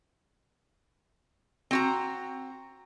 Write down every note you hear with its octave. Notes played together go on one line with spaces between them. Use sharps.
C4 F#4 A#5